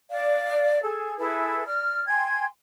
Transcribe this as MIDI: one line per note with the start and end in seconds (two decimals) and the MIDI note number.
0.09 0.79 74
0.09 0.79 77
0.82 1.16 68
0.82 1.16 69
1.18 1.62 64
1.18 1.62 68
1.18 1.62 69
1.18 1.62 71
1.66 2.04 74
1.66 2.04 89
2.07 2.44 79
2.07 2.44 80
2.07 2.44 84
2.07 2.44 92